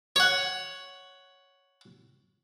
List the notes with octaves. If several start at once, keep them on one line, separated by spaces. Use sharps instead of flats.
C#5 F#5